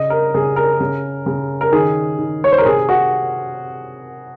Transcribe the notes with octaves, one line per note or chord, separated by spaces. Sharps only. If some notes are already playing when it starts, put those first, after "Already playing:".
Already playing: C#3 D#5
A#4
C#3 G#4
A#4
C#3
C#3
A#4
D#3 G#4
D#3
C#5
C5
A#4
C3 G#4
F#4